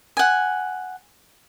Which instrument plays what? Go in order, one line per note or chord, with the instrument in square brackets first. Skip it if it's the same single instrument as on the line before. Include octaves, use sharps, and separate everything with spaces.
[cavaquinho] F#5 G#5